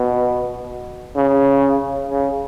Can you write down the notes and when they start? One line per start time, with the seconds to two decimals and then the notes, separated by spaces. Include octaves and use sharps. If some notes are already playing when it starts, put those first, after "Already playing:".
Already playing: B2
1.16 C#3
2.08 C#3